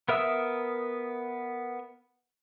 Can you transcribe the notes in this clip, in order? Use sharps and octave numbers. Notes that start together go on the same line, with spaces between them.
B3 A#4 E5 D#6 E6